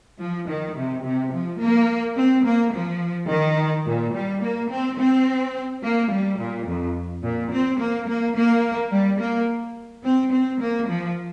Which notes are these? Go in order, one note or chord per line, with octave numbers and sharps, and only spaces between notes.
F3
D#3
C3
C3
F3
A#3
C4
A#3
F3
D#3
A#2
G3
A#3
C4
C4
A#3
G3
A#2
F2
A#2
C4
A#3
A#3
A#3
G3
A#3
C4
C4
A#3
F3